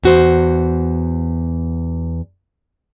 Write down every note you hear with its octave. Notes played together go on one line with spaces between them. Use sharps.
E2 F#4 C5